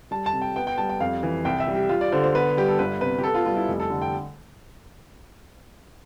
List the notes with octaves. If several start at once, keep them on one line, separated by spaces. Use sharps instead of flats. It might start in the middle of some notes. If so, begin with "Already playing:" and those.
G3 A5
A5
C3
G5
B3 G5
G5
G3 A5
G5
F2 F5
E3
C2 G5
E5
G3
G4
G3 F4
D5
D3 C5
C5
B3 B4
G3 G4
A4
G1 B4
C3 B4
G4
B3 A4
F4
G3 F4
E4
F1
A4
D3
G5